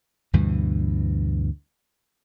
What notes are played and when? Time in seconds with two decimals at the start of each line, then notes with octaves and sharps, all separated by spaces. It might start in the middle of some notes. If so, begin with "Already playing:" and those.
0.33 D2 G2 B2 E3